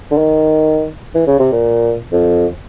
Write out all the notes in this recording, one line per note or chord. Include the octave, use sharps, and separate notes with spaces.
D3
D#3
E3
C#3
C3
A#2
F2